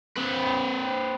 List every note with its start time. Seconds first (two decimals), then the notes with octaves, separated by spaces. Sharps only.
0.17 C4 B4